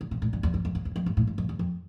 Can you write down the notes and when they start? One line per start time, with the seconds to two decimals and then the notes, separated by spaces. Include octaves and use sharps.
0.01 D3
0.11 C3
0.22 A2
0.33 G2
0.43 E2
0.54 F2
0.65 F2
0.75 F2
0.85 E2
0.96 F2
1.06 G2
1.17 A2
1.27 G2
1.38 F2
1.49 E2
1.59 F2